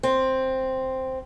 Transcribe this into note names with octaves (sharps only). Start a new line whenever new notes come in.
C4